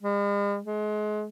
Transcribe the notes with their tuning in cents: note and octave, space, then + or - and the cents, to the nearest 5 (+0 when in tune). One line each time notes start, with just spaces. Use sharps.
G#3 -45
G#3 +30